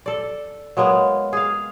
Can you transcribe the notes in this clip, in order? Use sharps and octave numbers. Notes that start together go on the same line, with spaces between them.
A4 D5
F#3 G#3 A#3 B3
G#4 F5